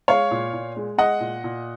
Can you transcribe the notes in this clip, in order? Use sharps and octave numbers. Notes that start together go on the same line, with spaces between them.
G#3 C#5 F5
A#2
A#2
G#3
G#3 D#5 F#5
A#2
A#2